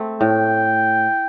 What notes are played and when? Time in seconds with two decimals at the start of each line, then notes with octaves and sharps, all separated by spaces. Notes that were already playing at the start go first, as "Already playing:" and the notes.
Already playing: A3 C4
0.21 A2 G5